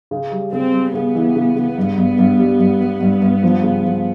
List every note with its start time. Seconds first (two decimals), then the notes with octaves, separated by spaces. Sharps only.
0.11 C#3
0.32 G3
0.53 C#3 C4
0.73 G3
0.94 C#3 B3
1.15 E3
1.36 C#3
1.56 C#3
1.77 G2
1.98 G2
2.19 G2
2.39 G3
2.59 G2
2.81 G3
3.01 G2
3.22 G2
3.43 F3
3.63 C#3
3.85 F3